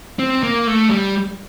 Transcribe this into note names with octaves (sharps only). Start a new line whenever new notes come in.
C4
A#3
A3
G3